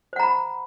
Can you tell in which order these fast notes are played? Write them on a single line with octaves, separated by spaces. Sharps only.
C5 F#5 A#5 B5